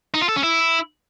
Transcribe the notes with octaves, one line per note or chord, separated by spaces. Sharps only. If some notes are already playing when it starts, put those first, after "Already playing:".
D#4
F4
A4
C#4
E4